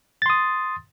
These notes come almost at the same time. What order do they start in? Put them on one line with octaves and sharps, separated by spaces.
A6 C6 D#6